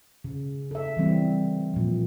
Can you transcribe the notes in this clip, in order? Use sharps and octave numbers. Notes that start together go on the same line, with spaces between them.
C#3
A4 E5
E3 G3 C4
A#2 F3